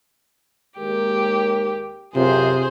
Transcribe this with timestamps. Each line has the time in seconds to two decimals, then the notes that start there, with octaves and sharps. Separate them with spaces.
0.79 D#2 G#3 G4 A#4
2.15 F#2 C3 C4 F4 G#4 C5